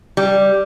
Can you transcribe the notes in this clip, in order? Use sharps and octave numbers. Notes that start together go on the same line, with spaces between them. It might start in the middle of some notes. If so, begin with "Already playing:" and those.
G3